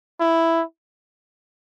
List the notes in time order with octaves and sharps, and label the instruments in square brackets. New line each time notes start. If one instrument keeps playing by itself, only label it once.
[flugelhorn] E4